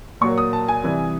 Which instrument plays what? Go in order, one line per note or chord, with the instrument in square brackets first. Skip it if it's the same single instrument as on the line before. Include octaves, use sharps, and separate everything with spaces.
[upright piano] A#2 F#3 A#3 C#6
D#6
A5
G#5
C3 E3 G3